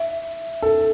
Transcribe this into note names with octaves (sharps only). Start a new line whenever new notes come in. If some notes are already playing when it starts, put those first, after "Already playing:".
Already playing: E5
A4